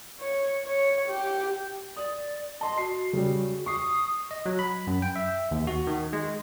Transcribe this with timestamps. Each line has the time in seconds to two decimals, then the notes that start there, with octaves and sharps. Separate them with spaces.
0.20 C#5
0.65 C#5
1.08 G4
1.96 D5 D#6
2.61 D#5 A5 C6
2.78 F#4 C7
3.13 C#3 G3
3.66 C#6 D#6 C7
4.31 D#5
4.46 F#3
4.59 B5
4.87 F#2
5.02 G5
5.16 E5
5.51 D#2
5.67 F#4
5.87 D#3
6.13 G#3